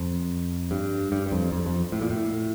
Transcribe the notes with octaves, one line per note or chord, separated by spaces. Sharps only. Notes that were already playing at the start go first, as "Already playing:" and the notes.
Already playing: F2
G2
G2
G2
F2
F2
F2
A2
A#2
A2